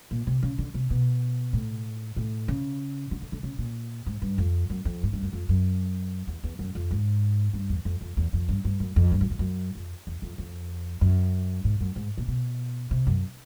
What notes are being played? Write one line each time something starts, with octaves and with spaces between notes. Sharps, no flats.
A#2
C3
C#3
D3
C3
B2
A2
A2
C#3
D3
D3
D3
C#3
A#2
G#2
G2
F2
F#2
F2
G#2
G2
F#2
F2
F#2
E2
E2
F#2
F2
G#2
G2
E2
F2
F2
E2
F2
G2
G2
F#2
F2
G2
F#2
F2
F#2
F2
E2
F2
F2
F#2
G#2
F#2
G#2
A#2
B2
C3
F#2